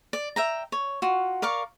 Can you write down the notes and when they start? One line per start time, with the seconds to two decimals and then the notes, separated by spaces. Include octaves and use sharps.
0.13 D5
0.36 E5 G5 A#5
0.72 C#5
1.02 F4 F#4
1.42 A#4 D5 F5 C#6